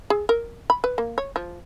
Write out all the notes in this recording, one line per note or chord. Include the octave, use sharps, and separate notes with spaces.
G#4
A#4
B5
B4
A#3
C#5
F3